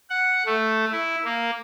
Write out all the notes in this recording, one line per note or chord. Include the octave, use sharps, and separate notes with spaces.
F#5
A3
E4
A#3